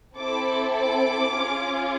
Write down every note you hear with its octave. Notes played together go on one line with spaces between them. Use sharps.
C4 E4 A4 D6
D6
C#4 F4 G#4